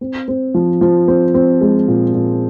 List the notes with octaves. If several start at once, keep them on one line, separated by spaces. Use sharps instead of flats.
C4
C4
F3
F3
C4
C4
G#3
A#2
A#2